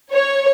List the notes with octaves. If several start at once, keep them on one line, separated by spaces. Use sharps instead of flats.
C#5